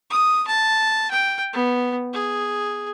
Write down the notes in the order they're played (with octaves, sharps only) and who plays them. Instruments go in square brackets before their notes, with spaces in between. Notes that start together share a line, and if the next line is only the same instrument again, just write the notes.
[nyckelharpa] D#6
A5
G5
B3
G#4